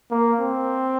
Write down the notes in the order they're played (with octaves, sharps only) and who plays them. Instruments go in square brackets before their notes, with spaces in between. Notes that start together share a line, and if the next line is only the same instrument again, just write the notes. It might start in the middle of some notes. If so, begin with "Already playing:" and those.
[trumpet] A#3
C4